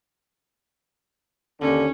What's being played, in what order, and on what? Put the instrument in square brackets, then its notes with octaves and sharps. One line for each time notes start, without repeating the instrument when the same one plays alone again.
[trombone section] D#2 D3 [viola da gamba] C#4